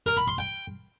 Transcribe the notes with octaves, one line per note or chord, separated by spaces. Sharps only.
A#4
B5
C6
G5